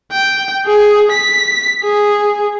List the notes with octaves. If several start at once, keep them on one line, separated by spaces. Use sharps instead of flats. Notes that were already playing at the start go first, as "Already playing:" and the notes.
G5
G#4
B6
G#4